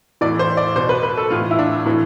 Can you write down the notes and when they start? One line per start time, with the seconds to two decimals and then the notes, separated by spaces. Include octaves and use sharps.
0.21 A2 E3 D5
0.39 C5
0.57 D5
0.76 B2 C5
0.89 B4
1.03 B4
1.18 A4
1.31 A2 E3 F4
1.51 E4
1.59 D4
1.85 A2 E3